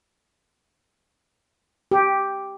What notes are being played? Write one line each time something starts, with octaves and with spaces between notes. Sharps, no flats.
G4